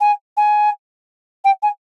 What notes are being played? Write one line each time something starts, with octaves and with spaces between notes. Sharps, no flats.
G#5
G#5
G5
G#5